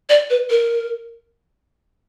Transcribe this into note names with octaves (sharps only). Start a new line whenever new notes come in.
D5
B4
A#4